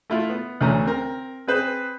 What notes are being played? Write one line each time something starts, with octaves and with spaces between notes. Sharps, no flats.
A3 E4 F4
B3
D2 E3 A3 C#4 A#5
C4 A#4
C4 G#4 B4 C5